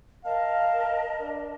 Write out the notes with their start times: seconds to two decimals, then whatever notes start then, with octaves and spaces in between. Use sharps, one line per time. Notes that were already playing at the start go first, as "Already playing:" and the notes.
0.24 A#4 D#5 F5 A5
1.20 D4